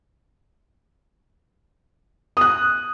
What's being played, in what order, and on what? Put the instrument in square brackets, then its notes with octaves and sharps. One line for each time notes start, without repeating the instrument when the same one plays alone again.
[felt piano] D#6 F#6